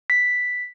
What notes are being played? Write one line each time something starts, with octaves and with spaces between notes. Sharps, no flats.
B6